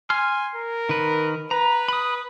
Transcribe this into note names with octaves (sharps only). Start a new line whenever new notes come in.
G#5 C6 F6
A#4
D#3 B4
B4 A#5
B5 D#6